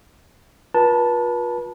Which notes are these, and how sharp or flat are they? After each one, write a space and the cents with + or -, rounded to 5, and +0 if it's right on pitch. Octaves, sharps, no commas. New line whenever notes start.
F4 +35 B4 -40 A5 +0